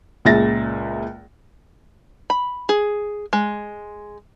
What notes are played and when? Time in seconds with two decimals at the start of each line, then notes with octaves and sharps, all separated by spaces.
0.25 C#2 A#2 G#3 E5 A6 A#6
2.30 B5
2.69 G#4
3.33 G#3